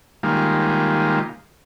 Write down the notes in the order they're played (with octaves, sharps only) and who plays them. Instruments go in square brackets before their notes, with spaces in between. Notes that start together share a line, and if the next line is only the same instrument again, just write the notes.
[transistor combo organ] D#3 G3 G#3 A#3 F4